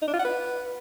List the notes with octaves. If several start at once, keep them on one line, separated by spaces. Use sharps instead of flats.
D#4
D4
F4
F#5
B4